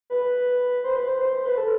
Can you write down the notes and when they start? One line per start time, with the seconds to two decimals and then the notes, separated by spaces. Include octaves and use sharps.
0.10 B4
0.84 C5
0.96 B4
1.08 C5
1.20 C5
1.32 C5
1.45 B4
1.57 A4